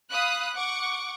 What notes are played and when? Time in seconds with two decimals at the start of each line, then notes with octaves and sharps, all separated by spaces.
0.11 F5 B5 D#6 F#6
0.55 F#5 C#6 D6